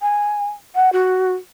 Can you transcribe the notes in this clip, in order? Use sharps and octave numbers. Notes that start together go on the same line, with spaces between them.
G#5
F#5
F#4